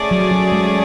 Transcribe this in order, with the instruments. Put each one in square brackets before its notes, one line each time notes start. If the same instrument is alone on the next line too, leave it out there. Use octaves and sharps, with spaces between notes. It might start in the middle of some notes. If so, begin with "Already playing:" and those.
Already playing: [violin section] A3 C#4 G#4 D5
[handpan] F#3
F#3
G#3